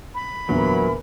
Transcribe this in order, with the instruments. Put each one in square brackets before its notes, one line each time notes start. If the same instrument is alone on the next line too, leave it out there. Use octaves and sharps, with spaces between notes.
[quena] B5
[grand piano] E2 A#2 D3 [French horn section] E3 A#4 [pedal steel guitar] F#3